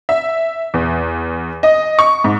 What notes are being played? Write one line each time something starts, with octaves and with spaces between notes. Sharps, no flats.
E5
E2
D#5
C#6
G#2